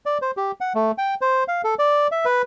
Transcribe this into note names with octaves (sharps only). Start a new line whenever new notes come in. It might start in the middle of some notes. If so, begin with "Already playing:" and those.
D5
C5
G4
F#5
A3
G5
C5
F5
A4
D5
E5
B4